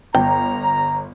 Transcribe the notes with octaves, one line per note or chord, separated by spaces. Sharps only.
G1 G5 A#5